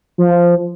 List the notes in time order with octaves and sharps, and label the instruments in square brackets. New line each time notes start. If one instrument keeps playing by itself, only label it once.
[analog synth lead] F3